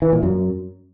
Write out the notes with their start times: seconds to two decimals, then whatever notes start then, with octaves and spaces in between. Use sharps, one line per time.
0.02 E3
0.12 A#2
0.23 F#2